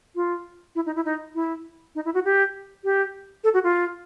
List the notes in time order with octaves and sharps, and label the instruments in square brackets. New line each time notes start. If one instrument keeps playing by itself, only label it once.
[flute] F4
E4
D#4
E4
D#4
E4
D#4
E4
F#4
G4
G4
A4
F#4
F4